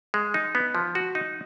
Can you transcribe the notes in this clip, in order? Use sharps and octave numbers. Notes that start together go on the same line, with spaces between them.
G#3
D#4
B3
F3
F#4
D#4